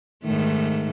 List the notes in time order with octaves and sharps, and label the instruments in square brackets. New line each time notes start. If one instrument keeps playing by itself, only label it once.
[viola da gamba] G#2 D#3 A3